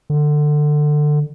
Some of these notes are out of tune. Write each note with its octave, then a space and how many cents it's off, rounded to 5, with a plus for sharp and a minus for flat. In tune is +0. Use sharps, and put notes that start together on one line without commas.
D3 +20